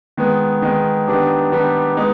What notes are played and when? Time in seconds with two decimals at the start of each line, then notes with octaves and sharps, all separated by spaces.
0.17 D#3 G#3 B3
0.62 D#3 G#3 B3
1.07 D#3 G3 B3 D4 G4
1.52 D#3 G3 B3 D4 G4
1.97 G#3 B3 D#4